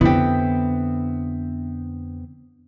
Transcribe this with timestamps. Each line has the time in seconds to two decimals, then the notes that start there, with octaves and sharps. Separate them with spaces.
0.01 F2 D3 B3 C4 E4 G4